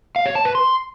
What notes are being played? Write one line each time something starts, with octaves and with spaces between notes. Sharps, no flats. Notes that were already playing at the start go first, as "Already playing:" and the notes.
F5
C#5
A5
B4
C6